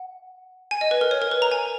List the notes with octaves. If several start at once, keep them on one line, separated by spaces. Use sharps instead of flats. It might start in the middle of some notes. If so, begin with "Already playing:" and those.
Already playing: F#5
G#5
D#5
B4
A#4
C#5
A#4
B4
A#5
G#5